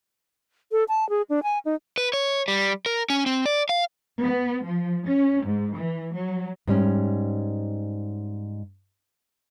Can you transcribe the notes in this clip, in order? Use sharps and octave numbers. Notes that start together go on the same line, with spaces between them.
A4
A5
G#4
D4
G#5
D#4
B4
C#5
G3
A#4
C#4
C4
D5
F5
B3
F3
C#4
G#2
E3
F#3
G#2 G3 C#4